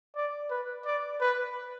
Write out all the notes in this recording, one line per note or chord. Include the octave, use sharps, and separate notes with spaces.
D5
B4
D5
B4